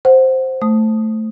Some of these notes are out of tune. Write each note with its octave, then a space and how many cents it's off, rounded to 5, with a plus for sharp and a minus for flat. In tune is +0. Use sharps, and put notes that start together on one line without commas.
C5 +0 F#5 +0
A3 +0 D#6 +0